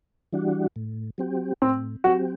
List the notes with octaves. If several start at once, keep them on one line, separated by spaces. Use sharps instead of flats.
E3 G3 D4 F#4
A2
F#3 C4 G4
A2 C4
F#3 C4 F#4 G4